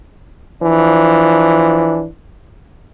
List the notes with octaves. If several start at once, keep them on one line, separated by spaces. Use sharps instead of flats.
E3 F3 D4